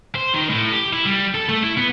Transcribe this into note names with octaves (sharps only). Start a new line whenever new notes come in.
C5
D#3
A2
G4
E4
G3
A4
A3
E4
B3